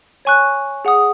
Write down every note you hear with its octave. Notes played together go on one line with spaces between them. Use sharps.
C#5 G#5 C#6 F#6
G#4 F#5 D#6